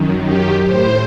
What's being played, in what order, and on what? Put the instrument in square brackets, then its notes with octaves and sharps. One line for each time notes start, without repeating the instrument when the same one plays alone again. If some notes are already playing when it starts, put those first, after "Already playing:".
Already playing: [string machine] F#2 D#3
G4
A2 C5